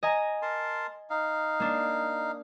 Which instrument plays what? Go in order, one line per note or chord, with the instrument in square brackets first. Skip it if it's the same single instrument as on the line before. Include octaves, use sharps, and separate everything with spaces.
[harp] D#5 G#5 A#5
[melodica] A#4 A5 C6
D#4 F5
[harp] A#3 D4